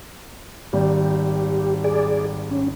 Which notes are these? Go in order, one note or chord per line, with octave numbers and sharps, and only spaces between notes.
G#1 G3 G4
G#4 D5
C#4